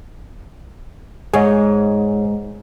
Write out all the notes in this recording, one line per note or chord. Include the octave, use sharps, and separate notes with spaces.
G#2 G#4 C#5 D#5